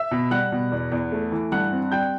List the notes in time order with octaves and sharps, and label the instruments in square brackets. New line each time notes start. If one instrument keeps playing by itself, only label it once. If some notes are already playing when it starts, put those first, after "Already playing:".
Already playing: [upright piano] E5 E6
B2
G3 F#5 F#6
B2
E2
E2
A3
E3
G2 F#5 F#6
C4
G3 G5 G6